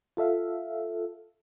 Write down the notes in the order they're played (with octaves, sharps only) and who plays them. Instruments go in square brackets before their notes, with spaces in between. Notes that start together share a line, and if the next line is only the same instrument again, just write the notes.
[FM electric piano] F4 A4 E5 F5